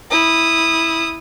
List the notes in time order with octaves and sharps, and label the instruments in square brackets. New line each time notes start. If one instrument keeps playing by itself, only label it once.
[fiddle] E4 D#6